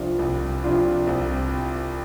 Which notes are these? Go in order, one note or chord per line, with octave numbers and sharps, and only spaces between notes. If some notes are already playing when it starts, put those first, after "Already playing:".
Already playing: C2 C3 F3 D4 F4
C2
C3 F3 D4 F4
C2